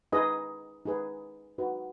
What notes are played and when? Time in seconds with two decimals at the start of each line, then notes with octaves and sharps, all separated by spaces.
0.12 D#4 G#4 B4 D#5
0.85 D#4 G#4 B4
1.58 D#4 F#4 B4